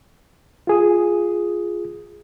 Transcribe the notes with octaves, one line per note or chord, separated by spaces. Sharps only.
F4 G#4 D#6